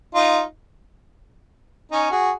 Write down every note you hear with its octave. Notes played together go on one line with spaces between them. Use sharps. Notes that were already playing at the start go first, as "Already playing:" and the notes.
D#4 F4
C#4 D#4
F#4 G#4